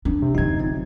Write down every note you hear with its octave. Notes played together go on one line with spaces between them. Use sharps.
D4
C3
D3 F#3 D#4 G#6
G1 C4